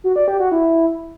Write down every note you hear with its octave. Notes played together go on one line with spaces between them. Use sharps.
F#4
D5
G4
F#4
E4